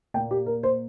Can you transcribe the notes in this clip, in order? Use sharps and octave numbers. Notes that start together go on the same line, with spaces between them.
A#2 A#3 G5
G4
A#4
C5